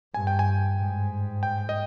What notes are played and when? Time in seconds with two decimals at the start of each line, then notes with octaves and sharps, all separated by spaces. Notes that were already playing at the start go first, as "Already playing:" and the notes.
0.14 G2 G#5
0.27 G5
0.39 G#5
0.79 G#2
1.43 G5
1.69 D#5